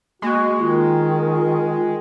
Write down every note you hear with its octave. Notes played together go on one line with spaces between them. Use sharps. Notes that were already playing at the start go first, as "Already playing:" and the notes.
G#3 A#3 F#4
D#3 F4
F4